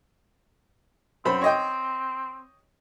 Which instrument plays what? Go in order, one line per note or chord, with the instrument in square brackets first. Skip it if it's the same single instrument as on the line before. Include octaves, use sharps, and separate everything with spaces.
[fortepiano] F#2 C5 B5 [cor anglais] C4
[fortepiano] C#5 D#5 G5